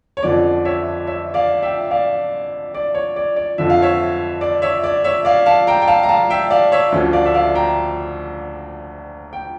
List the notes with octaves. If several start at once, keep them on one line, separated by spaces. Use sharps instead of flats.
C#5
F2 D3 F3 C#4 D5
C#5 E5
C#5 E5
D5 F5
E5 G5
D5 F5
D5
C#5
D5
D5
F2 D3 F3 E5
F5
C#5 E5
D5
C#5 E5
D5
C#5 E5
D5 F5
F5 A5
G5 A#5
G5
F5 A5
A#5
F5 A5
E5 G5
D5 F5
C#5 E5
D2 D3 F3 C#4
D5 F5
E5
D5 F5
G5 A#5
G5